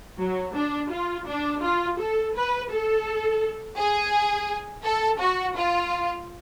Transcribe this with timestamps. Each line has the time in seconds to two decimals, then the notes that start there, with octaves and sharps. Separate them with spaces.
0.19 F#3
0.55 D4
0.91 F4
1.27 D4
1.62 F4
1.98 A4
2.35 B4
2.71 A4
3.78 G#4
4.84 A4
5.20 F#4
5.57 F4